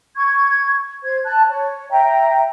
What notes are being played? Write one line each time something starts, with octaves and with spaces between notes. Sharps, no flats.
C#6 G#6
C5 G#6
A5 F#6
C#5
E5 G5 A#5